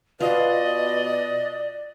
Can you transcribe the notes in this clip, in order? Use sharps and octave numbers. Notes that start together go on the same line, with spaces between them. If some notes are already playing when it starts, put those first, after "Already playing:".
B2 F4 D5 D#5